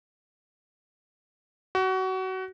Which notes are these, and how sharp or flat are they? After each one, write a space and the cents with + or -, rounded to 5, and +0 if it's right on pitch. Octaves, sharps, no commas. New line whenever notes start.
F#4 +25